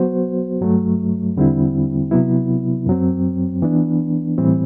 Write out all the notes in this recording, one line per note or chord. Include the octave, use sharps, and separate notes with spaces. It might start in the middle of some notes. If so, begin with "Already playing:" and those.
Already playing: F#3 B3 F#4 C5
G2 F#3 A3
E2 D3 G3 C4 E4
C3 F#3 B3 E4
F#2 F#3 C4
E3 B3 D4
A2 E3 G3 C4